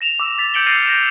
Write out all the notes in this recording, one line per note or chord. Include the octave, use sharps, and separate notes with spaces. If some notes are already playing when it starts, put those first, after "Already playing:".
A#6 E7 F7
D6 E6
A6 B6 F7
D6 G6 C#7 D7 F#7 G7
F6 G6 A6 A#6 C7 D#7
A#6 E7